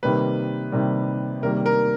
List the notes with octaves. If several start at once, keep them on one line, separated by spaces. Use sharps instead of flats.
C3 D#3 G3 A#3 B4
C3 D#3 G3 A#3
C3 D#3 G3 A#3 A#4
A#4